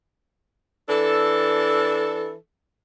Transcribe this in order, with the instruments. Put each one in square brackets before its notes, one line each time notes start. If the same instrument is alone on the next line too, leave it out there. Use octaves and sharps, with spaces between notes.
[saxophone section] E3 D4 A4